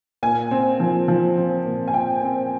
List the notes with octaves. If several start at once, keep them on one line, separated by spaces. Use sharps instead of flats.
A#2 G#5
C4
F3
F3
C4
A#2
G#5
C4 G5
C4